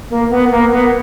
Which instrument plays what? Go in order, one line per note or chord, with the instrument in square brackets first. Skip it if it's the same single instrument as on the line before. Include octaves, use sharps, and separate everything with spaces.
[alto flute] A#3
B3
A#3
B3